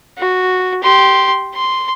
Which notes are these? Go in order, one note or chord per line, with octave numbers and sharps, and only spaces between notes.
F#4
G4 C6
C6